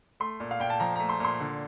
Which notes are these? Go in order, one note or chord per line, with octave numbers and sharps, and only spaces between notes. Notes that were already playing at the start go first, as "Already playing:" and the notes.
A3 C6
A#2
F5
A#2 G5
A5
F3 A#5
A#5
A3
C6
A#2 C6
D3